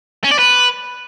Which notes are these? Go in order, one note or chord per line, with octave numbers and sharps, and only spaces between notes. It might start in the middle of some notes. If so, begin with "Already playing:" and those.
C#4
D5
B4